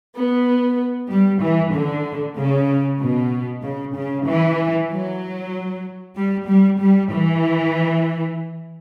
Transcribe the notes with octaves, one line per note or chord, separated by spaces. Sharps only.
B3
G3
E3
D3
C#3
B2
C#3
C#3
E3
F#3
G3
G3
G3
E3